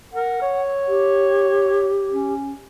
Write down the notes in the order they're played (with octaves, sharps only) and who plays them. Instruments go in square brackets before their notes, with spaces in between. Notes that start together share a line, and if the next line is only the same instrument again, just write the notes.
[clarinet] A#4 [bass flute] F#5
[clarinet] C#5
[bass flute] G4
[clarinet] C#4